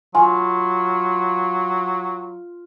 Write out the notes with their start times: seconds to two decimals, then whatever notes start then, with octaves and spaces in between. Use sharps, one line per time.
0.15 F#3 F4 G#5